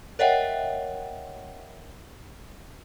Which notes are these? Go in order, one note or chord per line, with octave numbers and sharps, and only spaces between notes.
A#4 C#5 D#5 E5 F#5 G5